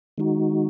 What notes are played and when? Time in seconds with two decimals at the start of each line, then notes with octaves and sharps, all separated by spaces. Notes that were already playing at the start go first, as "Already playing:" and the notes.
0.18 D#3 G#3 D#4 F#4